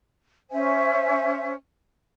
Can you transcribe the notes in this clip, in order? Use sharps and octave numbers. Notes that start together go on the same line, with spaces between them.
C#4 C5 E5 G#5